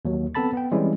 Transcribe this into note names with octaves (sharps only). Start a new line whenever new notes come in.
D#2 F#3
B3 C4 A4 A5 B5 A6
B3 G5
E3 G3 G#3 C4 C#4 E4